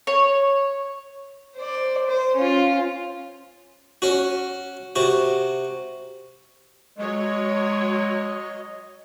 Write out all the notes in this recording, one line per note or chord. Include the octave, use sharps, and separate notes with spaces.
C#5
C5 D5
C5
C#4 F4
C#4 F#4
C3 F#4
F#3 G#3 C#5 D#5